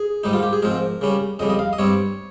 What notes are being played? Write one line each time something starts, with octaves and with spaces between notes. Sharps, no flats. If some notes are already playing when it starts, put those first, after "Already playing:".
Already playing: G#4
G#2 D#3 G3 D#4
F4
G4
G#4
G#2 F3 C4 A#4
C#3 G3 C#4
F2 C#3 G3 D#5
D#5
F5
D#5
G2 G3 C4 C#5